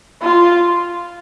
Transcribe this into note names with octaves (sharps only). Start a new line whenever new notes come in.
F4